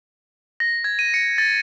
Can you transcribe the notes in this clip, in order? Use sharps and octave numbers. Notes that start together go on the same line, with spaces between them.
A#6
G#6
D#7
C#7
A6